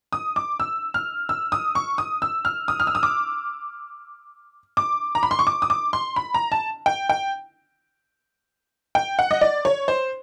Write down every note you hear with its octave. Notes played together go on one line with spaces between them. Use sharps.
D#6
D6
E6
F6
E6
D#6
C#6
D#6
E6
F6
D#6
F6
E6
D#6
D6
D6
A#5
B5
C6
C#6
D6
D#6
D6
C6
B5
A#5
A5
G5
G5
G5
F#5
D#5
D5
C#5
C5